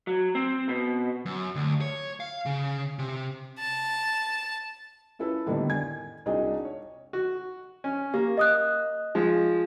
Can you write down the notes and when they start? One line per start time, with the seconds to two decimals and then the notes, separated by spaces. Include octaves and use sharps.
0.07 F#3
0.35 C4
0.69 B2
1.26 F#2
1.55 D2
1.81 C#5
2.20 F5
2.46 C#3
2.99 C3
3.59 A5
5.19 C#4 E4 A4 B4
5.47 A2 D3 D#3 G3 A#3 B3
5.70 G#5 G#6
6.26 C2 D4 D#4 F#4 G#4 D#5
6.65 C#5
7.13 F#4
7.84 C#4
8.14 A#3 G4
8.37 D#5 D#6 F#6
9.15 F3 G#3